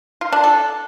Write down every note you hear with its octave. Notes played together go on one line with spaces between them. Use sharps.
F4
D4
A4